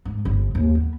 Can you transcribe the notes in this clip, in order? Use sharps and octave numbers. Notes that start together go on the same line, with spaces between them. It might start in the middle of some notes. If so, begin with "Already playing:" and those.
G#2
G1
D#2
B3